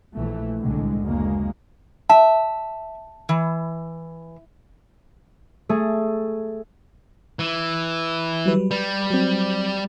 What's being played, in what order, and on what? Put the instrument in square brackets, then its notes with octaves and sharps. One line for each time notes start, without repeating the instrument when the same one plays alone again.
[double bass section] A#1 E3 A3
C2 A2 D3 G#3
F#1 D2 G#3 A#3
[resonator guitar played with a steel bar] E5 [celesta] A5
[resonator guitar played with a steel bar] E3
[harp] A3 G#4
[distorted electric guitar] E3
[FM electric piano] F#3 G3 B4
[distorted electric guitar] G3 [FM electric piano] B4
[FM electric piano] F#3 C4